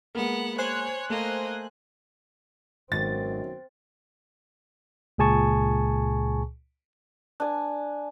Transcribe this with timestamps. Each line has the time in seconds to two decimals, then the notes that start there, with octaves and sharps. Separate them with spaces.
0.15 G#3 A#3 B3 F#5
0.58 C5 C#5 G#5 F#6
1.10 A3 A#3 D#5
2.92 G#1 F#2 B2 D#3 C4 A6
5.18 C#2 A#2 G#4 G#5 A5 C#6
7.40 D4 G#5